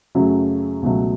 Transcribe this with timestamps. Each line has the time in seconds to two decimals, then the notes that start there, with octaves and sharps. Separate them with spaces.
0.15 F#2 C#3 F#3 A3
0.82 C#2 B2 F#3 A3